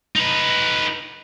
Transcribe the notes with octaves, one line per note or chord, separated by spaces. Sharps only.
D#4 B4